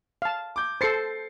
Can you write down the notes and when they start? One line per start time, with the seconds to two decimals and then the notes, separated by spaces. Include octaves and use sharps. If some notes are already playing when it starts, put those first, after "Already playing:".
0.22 F5 A5
0.56 D6 G6
0.81 A4 C5 A6 C7 C#7